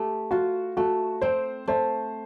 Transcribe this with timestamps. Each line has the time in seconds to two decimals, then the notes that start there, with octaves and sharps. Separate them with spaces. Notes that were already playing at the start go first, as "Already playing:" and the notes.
Already playing: A3 G4
0.31 F4 F#4
0.77 A3 F#4
1.22 C4 C5
1.68 A3 C5